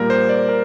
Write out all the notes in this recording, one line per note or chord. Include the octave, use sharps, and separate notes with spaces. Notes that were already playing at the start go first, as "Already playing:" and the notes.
Already playing: A#2 G3 A#3 A#4
C5
D5
A#4